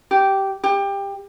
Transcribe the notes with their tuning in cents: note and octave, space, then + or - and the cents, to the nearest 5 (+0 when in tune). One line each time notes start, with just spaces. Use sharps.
G4 -10
G4 +20